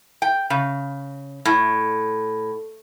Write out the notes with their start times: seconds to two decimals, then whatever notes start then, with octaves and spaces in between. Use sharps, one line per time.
0.22 G5
0.50 C#3
1.45 A2